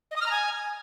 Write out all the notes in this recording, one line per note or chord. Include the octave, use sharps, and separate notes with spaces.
D#5
D#6
F6
A#5
G#5